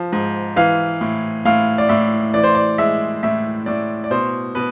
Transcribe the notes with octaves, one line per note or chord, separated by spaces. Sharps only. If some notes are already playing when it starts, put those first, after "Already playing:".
Already playing: F3
G#2
E3 F5
A2
A2 F5
D5
A2 E5
E3 D5
C5
D5
G#3 E5
A2 E5
A2 D5
D5
B2 C5
B2 B4